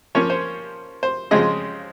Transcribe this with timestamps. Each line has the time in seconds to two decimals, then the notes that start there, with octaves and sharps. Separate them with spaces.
0.15 F3 A#3 C#4 C#5
0.30 C5
1.03 C5
1.31 C#3 F3 G#3 C4 D#5